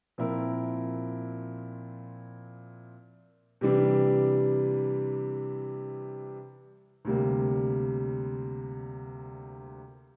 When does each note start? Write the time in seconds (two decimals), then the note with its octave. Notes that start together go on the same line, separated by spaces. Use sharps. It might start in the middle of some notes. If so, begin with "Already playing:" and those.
0.18 A#2 F3 C4 E4 A#4
3.61 C3 E3 G3 D4
7.05 D2 C3 G3 A#3